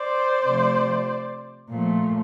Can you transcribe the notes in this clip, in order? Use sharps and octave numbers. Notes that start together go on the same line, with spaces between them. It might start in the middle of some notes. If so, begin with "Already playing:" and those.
Already playing: C5 D5
C3 F3 A3
A#2 F3 A3